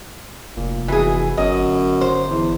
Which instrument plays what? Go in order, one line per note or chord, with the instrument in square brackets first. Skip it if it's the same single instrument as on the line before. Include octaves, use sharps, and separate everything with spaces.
[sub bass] F1 [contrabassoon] A#2
[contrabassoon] B2 [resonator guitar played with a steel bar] E3 G#4
[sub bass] G1 [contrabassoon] F#2 [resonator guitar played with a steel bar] D#5
[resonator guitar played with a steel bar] C5
[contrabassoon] E2